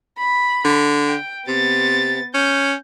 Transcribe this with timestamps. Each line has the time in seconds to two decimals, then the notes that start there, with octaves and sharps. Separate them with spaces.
0.19 B5
0.65 D3
1.08 G5
1.48 C3 B3 A6
2.34 C#4 G6